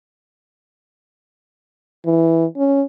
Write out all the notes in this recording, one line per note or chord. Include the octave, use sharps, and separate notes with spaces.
E3
C#4